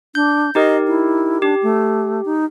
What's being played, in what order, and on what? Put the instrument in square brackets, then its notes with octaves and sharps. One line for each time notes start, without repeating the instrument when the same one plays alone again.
[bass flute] D4 [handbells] G6
[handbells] D#4 G4 A#4 [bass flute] D#5
[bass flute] E4
[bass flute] D4 [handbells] G4
[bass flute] A3
D#4